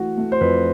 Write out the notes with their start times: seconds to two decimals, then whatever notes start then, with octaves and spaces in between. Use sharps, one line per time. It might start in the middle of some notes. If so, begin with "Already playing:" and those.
Already playing: E3 A3 F#4
0.17 A3
0.32 C5
0.41 F2 B4